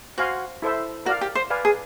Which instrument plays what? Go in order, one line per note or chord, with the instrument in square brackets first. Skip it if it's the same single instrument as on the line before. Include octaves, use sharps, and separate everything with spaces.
[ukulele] F#4 [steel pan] C5 F5 G#5 C6
[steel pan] E4 A4 C5 E5
[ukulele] F#4 [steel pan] A#4 D5 F5
[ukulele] G4
C5
[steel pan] B4 D5 F5 G#5
[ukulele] G#4